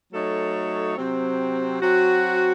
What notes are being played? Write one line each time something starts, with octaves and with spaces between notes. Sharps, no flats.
F#3 A3 D#4 A4 C#5
C3 F#3 C4
F#3 C4 F#4